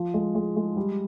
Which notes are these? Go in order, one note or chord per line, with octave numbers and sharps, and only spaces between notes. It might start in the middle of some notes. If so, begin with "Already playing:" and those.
Already playing: F3
G#3
G#3
G#3
G3